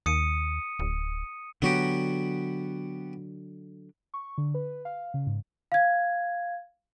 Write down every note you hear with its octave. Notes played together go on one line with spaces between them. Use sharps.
D#2 D#6 C#7 D#7
D1
D3 F#3 B3 F#4 G4
C#6
D3
B4
F5
C#3
G#2
F5 G#6